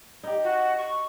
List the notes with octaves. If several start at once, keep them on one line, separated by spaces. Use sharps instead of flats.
D#4 G4
F#4
C#6